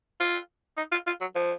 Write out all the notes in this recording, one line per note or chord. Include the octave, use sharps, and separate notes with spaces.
F4
D#4
F4
F4
F#3
F3